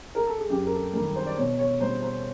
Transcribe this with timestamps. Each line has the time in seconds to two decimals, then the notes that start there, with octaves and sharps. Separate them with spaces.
0.15 A#4
0.26 A4
0.38 G#4
0.50 F#2 G4
0.66 A#4
0.72 A4
0.93 D#3 G3 A#4
1.15 C5
1.26 D5
1.37 B2 C#5
1.59 C#5
1.81 G3 C5
2.03 C5